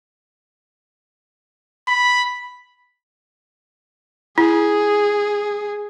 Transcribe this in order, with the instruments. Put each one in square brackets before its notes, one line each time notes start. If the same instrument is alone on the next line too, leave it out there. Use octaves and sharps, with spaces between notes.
[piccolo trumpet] B5
[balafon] E4 [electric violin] G#4